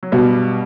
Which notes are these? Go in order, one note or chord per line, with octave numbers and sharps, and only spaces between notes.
F#3
G2 B2 G3